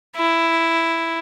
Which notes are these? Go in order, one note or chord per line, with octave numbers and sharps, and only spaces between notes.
E4